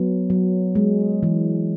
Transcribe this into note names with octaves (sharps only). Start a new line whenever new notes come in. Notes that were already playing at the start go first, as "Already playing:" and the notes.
Already playing: F#3 B3
F#3
G#3
E3